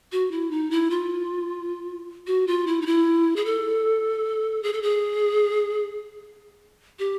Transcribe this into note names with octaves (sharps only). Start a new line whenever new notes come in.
F#4
E4
D#4
E4
F4
F#4
F4
E4
D#4
E4
G#4
A4
G#4
A4
G#4
G4